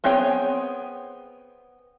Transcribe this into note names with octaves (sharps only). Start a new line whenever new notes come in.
B3 C4 G#4 C#5 G5